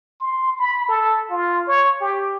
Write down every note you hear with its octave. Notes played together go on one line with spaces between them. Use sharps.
C6
B5
A4
F4
C#5
G4